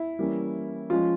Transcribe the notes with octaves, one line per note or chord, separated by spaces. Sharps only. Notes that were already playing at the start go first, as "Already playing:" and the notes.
Already playing: E4
E3 G3 A#3 C#4
F3 G#3 C#4 F4